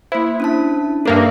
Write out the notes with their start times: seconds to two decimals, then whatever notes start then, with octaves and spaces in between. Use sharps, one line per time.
0.12 A#3 E4 C5
0.40 C#4 D4 A5
1.06 G2 A#3 D4 A4 A#4 E5